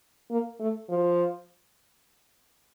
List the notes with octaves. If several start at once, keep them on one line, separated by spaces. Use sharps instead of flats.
A#3
A3
F3